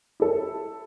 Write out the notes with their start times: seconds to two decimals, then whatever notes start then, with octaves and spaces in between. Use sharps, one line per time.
0.20 E4 A4